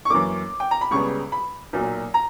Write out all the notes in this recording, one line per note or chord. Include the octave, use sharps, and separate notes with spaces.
C#6
F#2 E3 A#3 D6
G5
A#5
B5
C#2 C#3 G3 B3 C#6
B5
B1 A#2 F#3
A#5